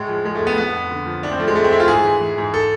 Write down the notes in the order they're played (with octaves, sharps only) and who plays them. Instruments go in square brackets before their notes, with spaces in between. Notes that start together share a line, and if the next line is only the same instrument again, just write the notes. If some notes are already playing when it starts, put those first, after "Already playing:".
Already playing: [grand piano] A2 G#3
F3
F3 G#3
A3
A2
B3
F2 B3
F2
D3
F3
A2 D4
C4
F3 A3
G#3
F3 A3
C4
A2 E4
F4
G#2 G#4
E3
E3
G#2
A4